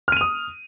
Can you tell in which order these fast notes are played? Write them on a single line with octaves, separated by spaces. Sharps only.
F6 D#7 F7 D#6